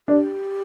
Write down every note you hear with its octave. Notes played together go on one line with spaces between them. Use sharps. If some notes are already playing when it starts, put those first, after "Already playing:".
D4 G4